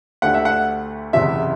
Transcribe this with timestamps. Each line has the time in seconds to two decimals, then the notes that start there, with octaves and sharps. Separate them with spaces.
0.22 D2 D3 A3 D4 G4 F#5
0.34 E5
0.45 F#5
1.13 F#1 E2 C3 E5